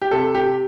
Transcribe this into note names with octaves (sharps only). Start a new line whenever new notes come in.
G4
C3 A4
G4